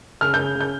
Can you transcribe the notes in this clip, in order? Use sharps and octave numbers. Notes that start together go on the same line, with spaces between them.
C#3 F6
G6
C#3
C#3
G6